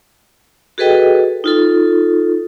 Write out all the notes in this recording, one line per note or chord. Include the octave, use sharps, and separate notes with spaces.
F#4 G#4 A4 B4 D#5 G5
D#4 F4 A4